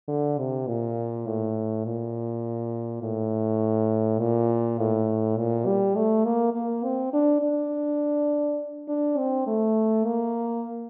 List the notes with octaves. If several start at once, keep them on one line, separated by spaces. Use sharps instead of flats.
D3
C3
A#2
A2
A#2
A2
A#2
A2
A#2
G3
A3
A#3
A#3
C4
D4
D4
D4
C4
A3
A#3